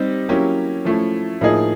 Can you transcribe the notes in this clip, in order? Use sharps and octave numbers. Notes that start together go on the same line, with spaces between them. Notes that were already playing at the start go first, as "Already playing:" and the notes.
Already playing: G3 C4 D#4 G4
F#3 A#3 C#4 E4 G4
F3 A3 C#4 E4
A2 F3 A#3 D#4 G#4